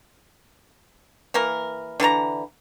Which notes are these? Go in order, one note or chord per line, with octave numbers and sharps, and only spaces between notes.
E3 A#3 A#4
D3 E3 A5 A#5